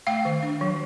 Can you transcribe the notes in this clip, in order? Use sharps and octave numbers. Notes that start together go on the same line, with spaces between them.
A3 F5 G5
D#3
D4
F#3